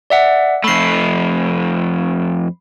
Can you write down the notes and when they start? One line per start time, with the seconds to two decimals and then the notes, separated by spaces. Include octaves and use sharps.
0.10 D5 E5 F#5
0.64 F2 A3 B5 C7